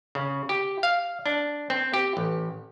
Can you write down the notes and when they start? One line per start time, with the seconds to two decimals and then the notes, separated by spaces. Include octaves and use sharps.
0.15 C#3
0.49 G4
0.83 F5
1.26 D4
1.70 C4
1.94 G4
2.17 A1